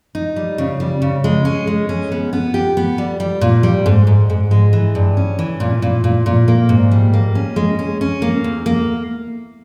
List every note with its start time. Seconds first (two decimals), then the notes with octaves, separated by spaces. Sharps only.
0.15 D#4
0.36 G3
0.58 C#3
0.80 G3
1.02 C#3
1.24 G#3
1.45 C#4
1.67 G#3
1.89 C#4
2.12 B3
2.33 B3
2.54 G4
2.77 B3
2.98 G3
3.20 G3
3.41 A#2
3.63 G3
3.86 G#2
4.07 G#2
4.30 G#2
4.51 G#3
4.73 E3
4.95 G2
5.17 C#4
5.39 E3
5.60 A#2
5.82 A#2
6.04 A#2
6.26 A#2
6.48 A#3
6.69 G#2
6.91 G3
7.13 A#3
7.35 C#4
7.56 G#3
7.79 C#4
8.01 C#4
8.22 A#3
8.44 E2
8.66 A#3